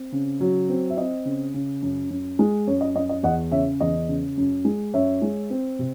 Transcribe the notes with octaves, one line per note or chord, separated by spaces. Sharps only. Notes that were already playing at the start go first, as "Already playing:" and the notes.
Already playing: C4
C#3
F#3
C4
E5
C4 D#5
C#3
C#3
F#2
F#2
G#3
F#2 C#5
D#5
F#2 D#5
D#5
E2 D#5 F#5
C#3 C#5 E5
E2 D#5
C#3
F#2
G#3
F#2 C#5 E5
G#3
C4
C3